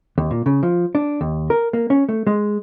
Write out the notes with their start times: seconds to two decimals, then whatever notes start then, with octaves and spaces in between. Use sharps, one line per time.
0.18 D#2
0.31 A#2
0.46 C#3
0.63 F3
0.95 D4
1.21 D#2
1.50 A#4
1.73 A#3
1.90 C#4
2.09 A3
2.27 G#3